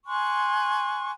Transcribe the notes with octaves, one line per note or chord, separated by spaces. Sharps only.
G#5 C6 C#6 F#6